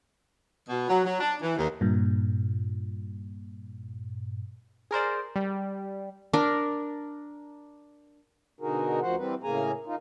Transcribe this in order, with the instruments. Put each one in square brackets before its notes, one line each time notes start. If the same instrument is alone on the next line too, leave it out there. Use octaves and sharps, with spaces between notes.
[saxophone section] B2
F#3
F#3
D4
E3
D#2
[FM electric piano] G2 A#2
[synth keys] G#4 A#4 C5 D5
G3
[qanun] D4 A#4
[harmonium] B2 D3 D#4 F#4 G#4 A#4
D2 F3 F#4 C5 F#5
E3 G3 C4 B4
A2 C#3 A#3 G#4 G#5 A#5
D#4 F4